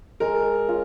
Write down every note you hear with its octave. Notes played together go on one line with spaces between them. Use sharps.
G#3 A#4
C#4 F4